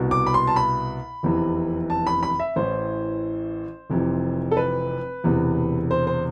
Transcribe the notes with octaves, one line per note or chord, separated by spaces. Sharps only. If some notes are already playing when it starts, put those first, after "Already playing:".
Already playing: C2 B2
D6
B5
C6
A5
B5
F1 E2 C3 E3
A5
B5
B5
E5
A1 A2 E3 C5
F1 F2 C3 E3
A4
B4
E1 E2 C3 E3
C5
C5